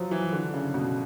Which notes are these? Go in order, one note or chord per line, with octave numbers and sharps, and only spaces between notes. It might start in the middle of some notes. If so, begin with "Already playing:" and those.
Already playing: F3 F#3
E3
D3
C#3
B2